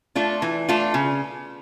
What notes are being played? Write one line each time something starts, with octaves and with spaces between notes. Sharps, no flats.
A3 D4 F4
E3
A3 D4 F4
C#3